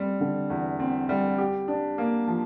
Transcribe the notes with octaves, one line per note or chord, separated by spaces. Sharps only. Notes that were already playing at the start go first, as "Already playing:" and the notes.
Already playing: G3 C4
D3
E2
C4
G3
G4
D4
A#3
F3